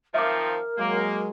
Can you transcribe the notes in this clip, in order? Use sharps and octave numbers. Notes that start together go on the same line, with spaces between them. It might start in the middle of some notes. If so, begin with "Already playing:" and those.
D#3 F3 C4 A#4 E5 D6
F#3 G#3 A#3